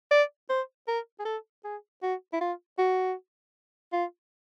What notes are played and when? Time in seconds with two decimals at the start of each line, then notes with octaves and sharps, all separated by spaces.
0.11 D5
0.49 C5
0.88 A#4
1.19 G#4
1.25 A4
1.64 G#4
2.03 F#4
2.33 E4
2.41 F4
2.78 F#4
3.93 F4